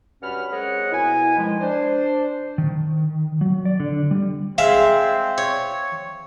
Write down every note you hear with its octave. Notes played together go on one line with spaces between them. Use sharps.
G2 F#3 C#4 F#5 B5 F6
G#3 C4 A#4 C#5 D#5 F#5
B2 E4 G#5
D#3 F3 G#3
D4 C5
D#3
F#3
D5
D3
G3
G#3 C4 E5 F5
C#5